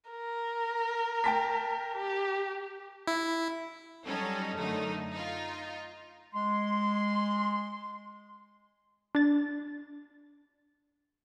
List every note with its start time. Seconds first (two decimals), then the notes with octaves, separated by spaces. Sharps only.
0.11 A#4
1.24 G5 A5 B6
1.97 G4
3.07 E4
4.06 F#3 G3 C#4 D#4 A4
4.57 F#2 D3 A3 D#4
5.12 D#4 F4
6.34 G#3 C6
9.15 D4 A6